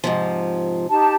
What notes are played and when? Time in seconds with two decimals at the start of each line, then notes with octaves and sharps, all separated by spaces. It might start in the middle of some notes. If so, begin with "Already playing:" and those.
0.04 G#2 C3 F3
0.90 D#4 G4 A5